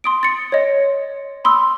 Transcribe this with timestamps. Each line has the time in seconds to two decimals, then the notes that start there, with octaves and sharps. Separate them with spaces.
0.04 C6 D#6 D7
0.23 A6 C#7
0.52 C#5 D#5
1.45 B5 C6 D#6 E6